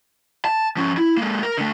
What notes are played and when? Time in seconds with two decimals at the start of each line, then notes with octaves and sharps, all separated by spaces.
0.45 A5
0.77 F3 C#4
0.97 E4
1.17 G#3 A#3
1.43 A#4
1.58 D3 A3